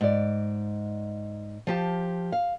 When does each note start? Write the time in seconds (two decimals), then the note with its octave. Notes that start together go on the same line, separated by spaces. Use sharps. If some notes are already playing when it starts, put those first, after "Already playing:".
0.01 G#2 D5
1.67 F3 G4 A5
2.32 F5